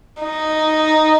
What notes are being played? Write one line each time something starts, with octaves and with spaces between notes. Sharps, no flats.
D#4